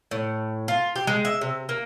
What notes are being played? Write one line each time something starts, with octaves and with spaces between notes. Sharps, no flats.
A2
F4
G4
G#3
E5
C3
A#3